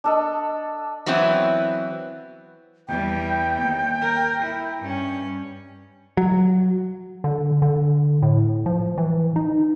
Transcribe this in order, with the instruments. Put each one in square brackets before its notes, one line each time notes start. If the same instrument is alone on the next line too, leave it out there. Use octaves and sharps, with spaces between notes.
[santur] D4 A4 D#5
[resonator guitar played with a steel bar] E3 F#3 B3 C4 E4
[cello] E2 G3 [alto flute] G5
[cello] D#2
A#4
E4
G2 C#4
[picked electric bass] F#3
[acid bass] D3
D3
A2
F3
E3
D#4